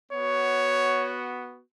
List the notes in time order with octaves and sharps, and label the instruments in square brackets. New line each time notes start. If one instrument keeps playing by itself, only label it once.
[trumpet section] B3 F#4 C#5